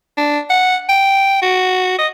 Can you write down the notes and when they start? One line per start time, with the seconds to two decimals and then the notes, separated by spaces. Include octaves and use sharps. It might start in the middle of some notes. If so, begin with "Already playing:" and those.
0.18 D4
0.50 F#5
0.89 G5
1.42 F#4
1.99 D#5